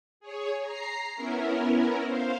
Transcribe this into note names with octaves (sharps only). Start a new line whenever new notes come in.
G#4 C#5
A#5 C7
B3 C#4 E4 A#4
C5 F5